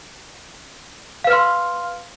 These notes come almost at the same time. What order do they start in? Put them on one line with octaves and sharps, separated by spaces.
F5 B4 F6 C6